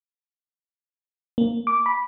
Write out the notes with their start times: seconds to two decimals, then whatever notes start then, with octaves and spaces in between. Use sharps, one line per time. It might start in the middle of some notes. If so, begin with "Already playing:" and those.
1.38 A#3
1.67 D6
1.86 B5